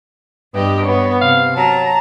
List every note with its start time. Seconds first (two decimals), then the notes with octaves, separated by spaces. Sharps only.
0.54 G2 B3 G4 D#5
0.85 B3 C#5
1.21 C3 F5
1.56 F#3 A5 A#5